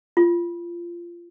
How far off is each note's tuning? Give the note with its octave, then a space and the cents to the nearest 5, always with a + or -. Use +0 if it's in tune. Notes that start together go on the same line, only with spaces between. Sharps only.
F4 -20